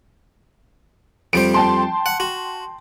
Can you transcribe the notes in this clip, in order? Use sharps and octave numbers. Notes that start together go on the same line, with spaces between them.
F2 G3 C5 D7
G5 A5 C6
F#5
F#4